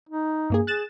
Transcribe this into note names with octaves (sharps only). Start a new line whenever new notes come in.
D#4
G2 A#3 G#4
G#4 F#6 A6 E7